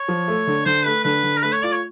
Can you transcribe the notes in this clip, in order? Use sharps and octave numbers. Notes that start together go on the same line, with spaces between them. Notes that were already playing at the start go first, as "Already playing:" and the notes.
Already playing: C#5
F3
A3
D3
D3 C5
A3 B4
D3 B4
D3
A#4
A3 B4
C#5
F4 D5
C#5